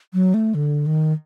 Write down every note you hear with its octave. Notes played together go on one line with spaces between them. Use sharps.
F#3
A3
D3
D#3